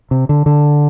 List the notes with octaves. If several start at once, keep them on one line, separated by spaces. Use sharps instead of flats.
C3
D3
D3